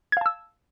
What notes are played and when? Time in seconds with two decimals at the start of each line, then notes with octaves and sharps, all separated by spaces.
0.12 G#6
0.17 F5
0.21 A5
0.26 E6